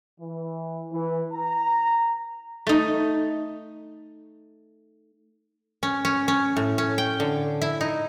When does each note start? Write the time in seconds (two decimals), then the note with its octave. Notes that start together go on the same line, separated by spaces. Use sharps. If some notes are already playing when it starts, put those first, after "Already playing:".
0.20 E3
0.92 E3
1.34 A#5
2.67 A3 D#4
5.83 C#4
6.05 C#4
6.28 C#4
6.57 A2
6.78 C#4
6.98 G5
7.20 D3
7.62 E4
7.81 D#4